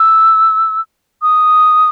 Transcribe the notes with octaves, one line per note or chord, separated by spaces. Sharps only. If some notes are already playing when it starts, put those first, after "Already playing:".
Already playing: E6
D#6